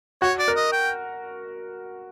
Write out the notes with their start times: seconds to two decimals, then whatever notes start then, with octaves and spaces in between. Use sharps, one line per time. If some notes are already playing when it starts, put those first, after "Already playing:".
0.22 F#4 C#5
0.39 D5
0.48 A#4
0.56 D#5
0.73 G5